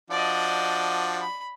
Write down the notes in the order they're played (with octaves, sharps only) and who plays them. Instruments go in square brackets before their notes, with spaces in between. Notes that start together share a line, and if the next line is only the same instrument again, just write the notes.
[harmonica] F3 D4 F#4 [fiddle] D5 D#5
[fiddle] B5